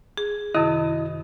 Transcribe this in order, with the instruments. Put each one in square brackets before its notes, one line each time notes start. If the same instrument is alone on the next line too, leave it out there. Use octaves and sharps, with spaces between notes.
[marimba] G#4
[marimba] F#2 C3 D#3 [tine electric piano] E4 D#5 D#6